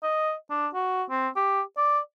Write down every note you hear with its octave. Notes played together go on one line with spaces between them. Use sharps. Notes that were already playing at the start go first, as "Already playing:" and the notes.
D#5
D4
F#4
C4
G4
D5